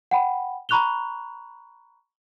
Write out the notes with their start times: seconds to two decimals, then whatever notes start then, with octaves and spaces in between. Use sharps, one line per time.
0.11 F#5 G5 B5
0.69 A#5 B5 C#6 F#6 F7 G7